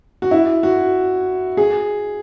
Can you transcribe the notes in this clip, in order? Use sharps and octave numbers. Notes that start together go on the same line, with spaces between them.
F#4
E4
F#4
G#4